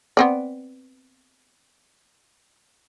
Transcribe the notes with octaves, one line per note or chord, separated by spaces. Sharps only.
B3 C4 D5